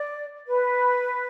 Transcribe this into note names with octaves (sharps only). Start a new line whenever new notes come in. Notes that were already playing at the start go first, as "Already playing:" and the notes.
Already playing: D5
B4